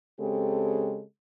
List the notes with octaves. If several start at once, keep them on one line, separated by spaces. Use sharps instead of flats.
C#3 G#3 C4 G4 A4